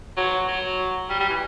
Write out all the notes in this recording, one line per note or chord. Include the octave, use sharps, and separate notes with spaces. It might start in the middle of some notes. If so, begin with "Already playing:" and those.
F#3
F#3
G3
G3
E3